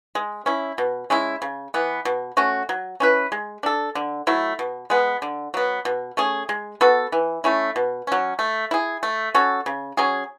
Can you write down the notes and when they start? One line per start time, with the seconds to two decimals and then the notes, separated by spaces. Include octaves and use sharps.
0.15 G#3
0.46 C#4 E4
0.78 B2
1.10 G#3 C#4 E4
1.42 C#3
1.74 E3 B3
2.05 B2
2.37 A3 C#4 F#4
2.69 F#3
3.00 C#4 E4 B4
3.32 G#3
3.63 D4 A4
3.95 D3
4.27 F#3 A3 E4
4.59 B2
4.90 G#3 B3
5.22 D3
5.54 F#3 B3
5.85 B2
6.17 A3 C#4 G#4
6.49 G#3
6.81 B3 F#4 A4
7.12 E3
7.44 A3 C#4 E4
7.76 B2
8.07 F#3 C#4
8.39 A3
8.71 E4 G#4
9.03 A3
9.35 C#4 F#4 A4
9.66 C#3
9.97 F#3 C#4 G#4